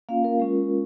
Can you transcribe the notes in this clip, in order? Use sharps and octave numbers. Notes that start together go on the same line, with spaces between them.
A#3 C#4 F4 F5
A#4
G#3 C#4 F4